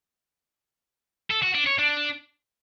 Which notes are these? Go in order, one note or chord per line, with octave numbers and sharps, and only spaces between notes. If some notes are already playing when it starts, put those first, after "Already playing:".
A4
F#4
D4
C#5
D4